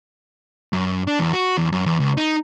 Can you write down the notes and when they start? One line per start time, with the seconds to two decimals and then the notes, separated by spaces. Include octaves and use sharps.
0.73 F#2
1.07 D4
1.19 E2
1.33 F#4
1.57 E2
1.72 F#2
1.86 E2
2.00 C#2
2.17 D#4